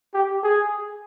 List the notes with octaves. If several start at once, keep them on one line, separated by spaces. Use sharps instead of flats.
G4
G#4